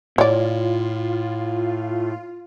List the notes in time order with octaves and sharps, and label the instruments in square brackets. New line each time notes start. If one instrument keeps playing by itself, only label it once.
[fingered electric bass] A2 [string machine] F4 [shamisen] C#5 D5